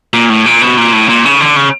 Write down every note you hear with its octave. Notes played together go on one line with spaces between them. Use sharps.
A#2
A2
A#2
B2
A#2
A2
A#2
C#3
D3
C#3